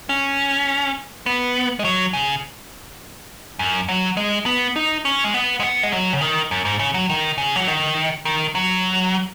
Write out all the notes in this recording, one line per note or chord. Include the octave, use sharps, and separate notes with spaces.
C#4
B3
G#3
F#3
C#3
F#2
F#3
G#3
B3
D#4
C#4
G#3
B3
G#3
B3
G#3
F#3
C#3
D#3
F#2
G#2
C#3
F#3
D#3
C#3
F#3
D#3
D#3
F#3